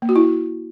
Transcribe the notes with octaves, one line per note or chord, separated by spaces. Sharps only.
A#3
F#4
E4